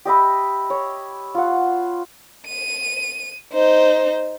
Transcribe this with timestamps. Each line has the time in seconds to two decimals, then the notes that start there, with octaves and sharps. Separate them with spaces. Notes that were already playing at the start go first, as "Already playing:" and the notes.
0.05 G4 D#5 E5 B5
0.70 C#5
1.35 F4 F#5
2.48 D#7
3.53 D#4 C5